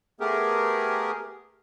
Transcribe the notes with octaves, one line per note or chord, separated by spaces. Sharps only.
A3 B3 G4 G#4 A#4